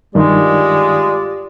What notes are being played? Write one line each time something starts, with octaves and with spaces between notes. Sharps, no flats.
G2 D#3 G#3 F4 G4 D5